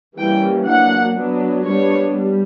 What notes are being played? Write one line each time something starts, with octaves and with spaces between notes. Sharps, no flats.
E3 G3 A#3 C#4 G5
F#3 A#3 D4 F#5
F#3 B3 D4
G3 B3 D4 C#5
G3